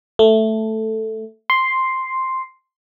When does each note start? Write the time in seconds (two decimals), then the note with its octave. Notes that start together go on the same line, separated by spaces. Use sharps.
0.19 A3
1.50 C6